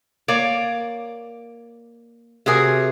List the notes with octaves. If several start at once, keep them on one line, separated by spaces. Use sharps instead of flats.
A#3 C#5 D5
C3 F#4 G#4 A#4